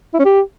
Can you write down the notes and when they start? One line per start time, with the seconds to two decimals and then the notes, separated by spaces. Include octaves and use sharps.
0.14 E4
0.19 C#4
0.25 G4